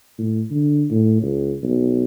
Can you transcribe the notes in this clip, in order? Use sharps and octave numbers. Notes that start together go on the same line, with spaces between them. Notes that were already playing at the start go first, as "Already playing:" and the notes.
A2
D3
A2
C#2
B1